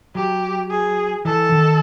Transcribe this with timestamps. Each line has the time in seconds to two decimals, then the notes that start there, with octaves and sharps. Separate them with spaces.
0.15 F#3 G4
0.70 G#4
1.25 E3 A4
1.52 D#3